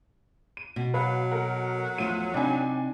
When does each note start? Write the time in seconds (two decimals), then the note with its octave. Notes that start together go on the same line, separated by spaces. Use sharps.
0.57 D#7
0.76 B2
0.94 F#3 B4 F5 F#5
1.31 A4 A#4 F#5
1.98 E2 F3 A3 D#7
2.34 C3 D4 D#4 G5 G#5